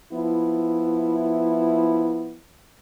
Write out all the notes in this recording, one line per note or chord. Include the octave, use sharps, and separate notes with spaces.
F3 B3 E4